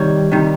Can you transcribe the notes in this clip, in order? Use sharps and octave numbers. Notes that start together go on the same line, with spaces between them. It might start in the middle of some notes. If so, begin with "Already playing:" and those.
Already playing: C3 D#3 G3 C#5
C3 D#3 G3